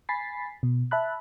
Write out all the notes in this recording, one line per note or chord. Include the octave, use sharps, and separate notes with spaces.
G#5 B5 A6 B6 C7
B2
E5 A5 B5 F#6